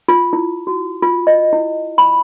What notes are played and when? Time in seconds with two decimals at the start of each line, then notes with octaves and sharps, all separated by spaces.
0.08 F4
0.33 E4
0.67 F#4
1.02 F4
1.27 D#5
1.53 E4
1.98 B5